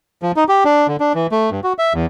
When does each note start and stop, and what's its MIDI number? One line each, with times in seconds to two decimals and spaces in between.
0.22 0.32 53
0.36 0.44 63
0.49 0.64 67
0.65 0.87 62
0.88 0.96 50
1.00 1.13 62
1.15 1.27 52
1.32 1.50 57
1.51 1.60 43
1.64 1.73 66
1.79 1.93 76
1.94 2.06 40